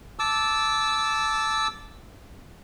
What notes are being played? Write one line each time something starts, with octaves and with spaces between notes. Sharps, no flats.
A5 D6 E6